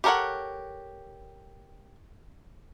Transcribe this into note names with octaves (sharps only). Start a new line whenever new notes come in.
G4 A4 A#4 C#5 F#5